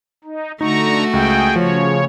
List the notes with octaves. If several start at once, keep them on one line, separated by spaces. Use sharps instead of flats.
D#4
D3 A3 D#4 F#4 A#5 C#6
C#2 G#4 G5
C#3 F3 C#5